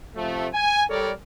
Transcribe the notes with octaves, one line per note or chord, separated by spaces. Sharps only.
C3 F3 A3
G#5
G3 A4 A#4 C#5 D5